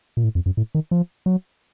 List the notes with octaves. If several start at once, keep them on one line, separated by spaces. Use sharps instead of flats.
A#2
A2
F2
F#2
A2
D#3
F3
F#3